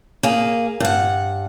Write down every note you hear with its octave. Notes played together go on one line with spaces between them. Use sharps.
A#3 G#4
G2 F#5